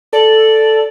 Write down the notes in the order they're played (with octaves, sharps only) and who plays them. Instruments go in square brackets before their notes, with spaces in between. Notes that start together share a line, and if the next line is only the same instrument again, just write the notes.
[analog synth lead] A4 [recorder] D5